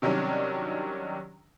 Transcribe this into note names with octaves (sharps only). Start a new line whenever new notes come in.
C3 D#3 F#3 G3 C#4 D4